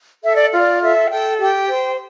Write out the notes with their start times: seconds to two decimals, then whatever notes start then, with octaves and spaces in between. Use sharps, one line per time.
0.23 A4 E5
0.35 D5
0.52 F4
0.58 D5
0.81 A4 E5
1.10 A4 G5
1.39 G4 G5
1.68 C5